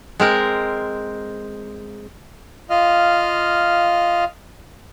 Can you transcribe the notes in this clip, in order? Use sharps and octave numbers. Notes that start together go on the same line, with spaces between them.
G#3 C4 A#4
F4 D#5 F5 F6